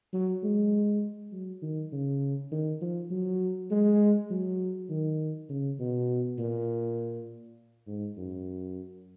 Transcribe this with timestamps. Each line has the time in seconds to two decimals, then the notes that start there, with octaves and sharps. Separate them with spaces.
0.13 F#3
0.43 G#3
1.32 F#3
1.62 D#3
1.92 C#3
2.51 D#3
2.81 F3
3.11 F#3
3.71 G#3
4.30 F#3
4.90 D#3
5.49 C#3
5.79 B2
6.38 A#2
7.87 G#2
8.17 F#2